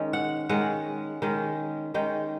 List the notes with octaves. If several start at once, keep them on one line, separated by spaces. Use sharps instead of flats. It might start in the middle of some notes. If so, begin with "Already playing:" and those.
Already playing: D#3 G#3 C#4
F#5
D#3 G#3 C#4 F#5
D#3 G#3 C#4
D#3 G#3 C#4 G5